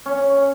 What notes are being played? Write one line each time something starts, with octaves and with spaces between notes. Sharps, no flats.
C#4